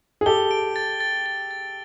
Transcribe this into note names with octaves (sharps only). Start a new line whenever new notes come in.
G#4
G4 A4 G7
D7
A6
A6
A6
A6